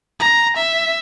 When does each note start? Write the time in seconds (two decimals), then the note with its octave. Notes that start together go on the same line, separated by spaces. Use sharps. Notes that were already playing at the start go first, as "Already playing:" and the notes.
0.20 A#5
0.57 E5